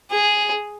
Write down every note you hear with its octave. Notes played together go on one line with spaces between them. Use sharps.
G#4